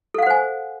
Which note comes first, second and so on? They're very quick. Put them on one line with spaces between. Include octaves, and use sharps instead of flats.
A4 F5 F#5 C5 G#5